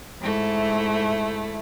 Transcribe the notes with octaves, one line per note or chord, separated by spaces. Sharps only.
G#2 A3 E4